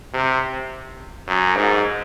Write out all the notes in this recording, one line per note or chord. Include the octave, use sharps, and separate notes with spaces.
C3
F#2
G#2